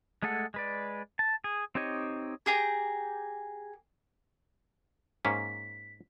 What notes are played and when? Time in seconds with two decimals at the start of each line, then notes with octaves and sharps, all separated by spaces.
0.22 G#3 A3 G#4 A4 F#5
0.54 G#3 B4 D5
1.19 A5
1.44 G#4
1.75 C4 D#4 G4 C#5 D#5
2.46 G4 G#4 A#5
5.25 G#2 A#3 C#4 B6